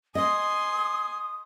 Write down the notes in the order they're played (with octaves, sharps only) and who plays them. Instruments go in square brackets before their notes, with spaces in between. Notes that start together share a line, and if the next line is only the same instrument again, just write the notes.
[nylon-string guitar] D#5 [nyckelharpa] G#5 C6 [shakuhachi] D#6